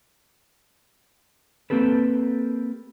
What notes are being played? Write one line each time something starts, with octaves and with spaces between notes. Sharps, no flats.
A#3 C4 G4 A4 B4